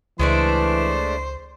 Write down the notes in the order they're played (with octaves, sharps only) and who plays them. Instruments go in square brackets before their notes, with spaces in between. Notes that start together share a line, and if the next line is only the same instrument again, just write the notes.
[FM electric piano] C#2 [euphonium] E3 [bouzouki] G#3 A3 D4 [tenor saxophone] C5